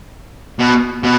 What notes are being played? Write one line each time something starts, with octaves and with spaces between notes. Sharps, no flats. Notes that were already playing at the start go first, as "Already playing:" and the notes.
B2
B2